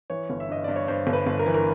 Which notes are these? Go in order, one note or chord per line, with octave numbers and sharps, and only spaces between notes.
E3 C#5
G1
E5
G2 D#5
G2 D5
C#5
G2 C5
G1
B4
G1
A#4
E3
A#4